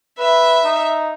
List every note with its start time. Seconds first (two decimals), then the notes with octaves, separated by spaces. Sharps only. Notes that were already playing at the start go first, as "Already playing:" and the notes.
0.19 B4 E5
0.65 D#4